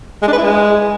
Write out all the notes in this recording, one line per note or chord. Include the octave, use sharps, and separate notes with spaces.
G#3
D4
B4
E4
G#3